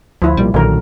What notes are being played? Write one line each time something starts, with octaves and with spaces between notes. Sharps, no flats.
D2 F3 E4
B1 A#2 G3
B1 A#2 D3 D#3 F#3 A#4